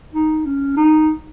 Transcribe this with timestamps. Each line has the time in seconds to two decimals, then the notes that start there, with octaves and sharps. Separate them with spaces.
0.14 D#4
0.45 C#4
0.77 D#4